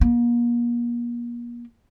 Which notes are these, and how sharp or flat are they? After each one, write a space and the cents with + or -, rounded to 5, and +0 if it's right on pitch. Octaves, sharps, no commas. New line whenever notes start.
A#3 +40